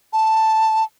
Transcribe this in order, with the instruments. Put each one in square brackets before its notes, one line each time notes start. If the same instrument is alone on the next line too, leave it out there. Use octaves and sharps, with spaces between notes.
[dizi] A5